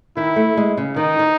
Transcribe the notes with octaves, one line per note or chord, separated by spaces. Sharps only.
D#3 E4
A3
G#3
C#3
D#3 D#4
D#3